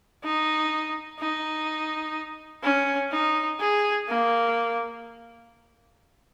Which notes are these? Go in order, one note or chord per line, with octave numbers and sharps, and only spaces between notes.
D#4
D#4
C#4
D#4
G#4
A#3